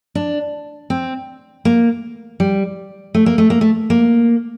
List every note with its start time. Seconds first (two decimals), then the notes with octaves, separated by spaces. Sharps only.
0.15 D4
0.90 C4
1.65 A#3
2.40 G3
3.14 A3
3.26 A#3
3.38 A3
3.50 A#3
3.61 A3
3.90 A#3